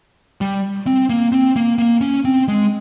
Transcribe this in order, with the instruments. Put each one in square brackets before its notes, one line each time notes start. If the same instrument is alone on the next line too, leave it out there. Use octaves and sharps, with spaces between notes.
[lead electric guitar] G3
C4
A#3
C4
A#3
A#3
C#4
C4
G#3